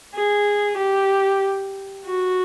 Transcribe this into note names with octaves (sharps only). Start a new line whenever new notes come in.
G#4
G4
F#4